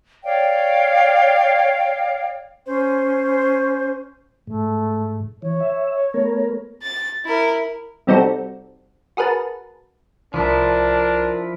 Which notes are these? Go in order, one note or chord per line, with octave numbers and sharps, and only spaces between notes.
C#5 D5 F5 G5
C#4 C5
G#2 A3
E3 C#5
E5
A3 B3 A#4
A6
E4 A#4
C3 G3 C4 D#4 F#4 A4
F#4 G#4 A#4 B4 A5
C2 F3 D4 E4 A#4